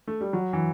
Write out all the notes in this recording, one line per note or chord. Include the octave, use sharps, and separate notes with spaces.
A3
G3
F#3
E3